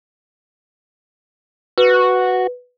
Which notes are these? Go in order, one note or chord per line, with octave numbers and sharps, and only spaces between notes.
F#4 B4